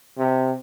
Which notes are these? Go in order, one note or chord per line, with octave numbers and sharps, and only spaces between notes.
C3